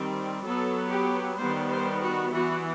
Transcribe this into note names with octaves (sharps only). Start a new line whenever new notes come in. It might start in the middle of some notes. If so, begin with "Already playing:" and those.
Already playing: D#3 G3 C4
F#3 B3 A4
G4
D#3 G3 B3 C5
C5
F#4
E3 B3 F#4